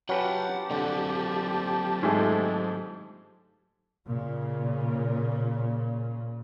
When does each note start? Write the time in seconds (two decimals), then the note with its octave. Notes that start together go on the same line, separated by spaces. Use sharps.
0.09 F#3 C#4 F4 G4 B4 F#5 G5 A5
0.71 D3 F#3 A#3 C4
2.03 G#2 G#3 A3
4.07 A#2 C#3